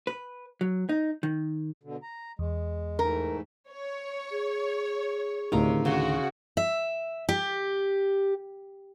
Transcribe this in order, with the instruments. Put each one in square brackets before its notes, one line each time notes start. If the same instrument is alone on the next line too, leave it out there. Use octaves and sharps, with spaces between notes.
[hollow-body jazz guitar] B4
F#3
D#4
D#3
[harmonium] B2 D3
A#5
[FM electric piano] E2 [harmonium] G#3
[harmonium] G#2 E3 A3 [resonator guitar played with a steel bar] A#4
[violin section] C#5
[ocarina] G#4
[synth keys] D2 A2 D#3 [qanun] C3 F5 A#5
[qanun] C#3 C6 [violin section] F#4
[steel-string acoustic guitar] E5
G4